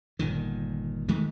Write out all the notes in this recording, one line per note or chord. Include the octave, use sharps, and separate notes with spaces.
G1 A#2 D#3
D#3 G#3 A3